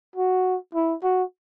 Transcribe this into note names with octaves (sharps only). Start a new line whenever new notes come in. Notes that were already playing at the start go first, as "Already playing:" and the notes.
F#4
E4
F#4